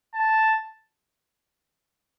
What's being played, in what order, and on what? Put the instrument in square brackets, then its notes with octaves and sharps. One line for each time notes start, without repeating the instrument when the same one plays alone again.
[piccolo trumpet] A5